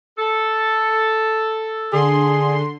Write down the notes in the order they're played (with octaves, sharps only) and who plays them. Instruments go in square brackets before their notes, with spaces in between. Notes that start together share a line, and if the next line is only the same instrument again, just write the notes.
[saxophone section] A4
[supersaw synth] D3 C6 [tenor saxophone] G#4